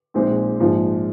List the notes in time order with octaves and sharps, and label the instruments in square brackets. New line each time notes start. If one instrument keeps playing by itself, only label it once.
[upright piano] A#1 A#2 G#3 C4 D#4
A#1 G#2 F3